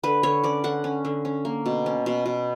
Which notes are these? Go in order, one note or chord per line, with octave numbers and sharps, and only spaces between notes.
D3 B4
D3 C#5
C#4 D5
D3 F#5
C#4
D3
C#4
A#3
B2
C#4
B2
B2